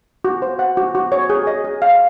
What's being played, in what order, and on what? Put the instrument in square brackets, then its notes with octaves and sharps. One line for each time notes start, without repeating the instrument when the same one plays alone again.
[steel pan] F#4
C5
F#5
F#4
F#4
C#5
G#4
D#5
G#4
F5